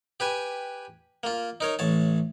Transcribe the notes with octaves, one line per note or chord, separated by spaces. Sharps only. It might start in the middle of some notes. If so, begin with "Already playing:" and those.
G4 B4 G#5
A#3 F4
D#4 A#4 C#5
A1 C#5 A5